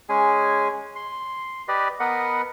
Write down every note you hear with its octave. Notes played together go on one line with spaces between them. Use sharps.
G#3 C#4 G#4 G#5
C6
G4 B4 D5 D#5
B3 A#4 B4 D#5 F#5